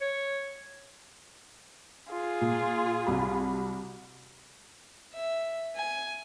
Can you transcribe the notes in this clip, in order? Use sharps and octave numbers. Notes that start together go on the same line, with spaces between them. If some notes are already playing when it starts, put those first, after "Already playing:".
C#5
F4 G#4
A#2
C2 F#3 B5
E5
G#5